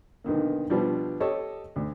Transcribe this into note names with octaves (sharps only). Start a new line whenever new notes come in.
B1 D3 D#3 A#3
B2 F3 G3 D4
G4 A4 C#5 D#5
D2